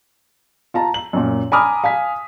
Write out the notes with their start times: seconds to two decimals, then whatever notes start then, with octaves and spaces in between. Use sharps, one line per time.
0.74 F4 A5 A#5
0.94 F#7
1.13 F#2 A#2
1.52 G#5 A#5 B5 D6 D#6 F6
1.84 F5 G#5 B6